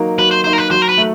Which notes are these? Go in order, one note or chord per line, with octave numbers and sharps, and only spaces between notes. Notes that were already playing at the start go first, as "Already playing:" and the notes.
Already playing: F#3 A#3 D#4
F#3 B4
C5
A#3 D#4 C5
A#4
B4
F#3 C5
A#4
B4
A3